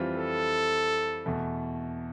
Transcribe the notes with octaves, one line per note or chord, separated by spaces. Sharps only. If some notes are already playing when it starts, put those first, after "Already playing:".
Already playing: F2 E3 G3 C4 F4
A4
E2 B2 A3